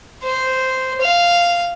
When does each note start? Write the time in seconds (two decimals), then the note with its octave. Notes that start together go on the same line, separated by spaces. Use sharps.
0.24 C5
1.02 F5